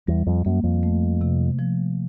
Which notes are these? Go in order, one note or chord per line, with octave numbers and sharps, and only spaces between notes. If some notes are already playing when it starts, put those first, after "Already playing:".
E2 G3
F2
F#2 A#3
F2
A3
C3
F3